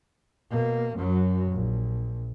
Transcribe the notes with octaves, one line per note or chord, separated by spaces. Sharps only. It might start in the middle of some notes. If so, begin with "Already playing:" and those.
B2 A#3
F#2 F#3
A#1